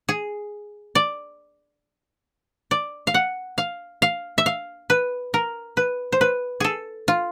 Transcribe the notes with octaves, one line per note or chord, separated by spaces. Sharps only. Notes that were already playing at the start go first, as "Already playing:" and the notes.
G#4
D5
D5
F5
F#5
F5
F5
E5
F5
B4
A#4
B4
C5
B4
G#4 A4
F4